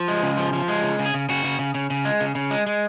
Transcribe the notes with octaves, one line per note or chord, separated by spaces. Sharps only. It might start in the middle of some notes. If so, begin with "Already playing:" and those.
Already playing: F3
G#3
C#3
F3
F3
G#3
C#3
C#3
G#4
C#3
C#3 F#4
C#3
C#3
C#3
C#3
G#3
C#3
C#3
G#3
G#3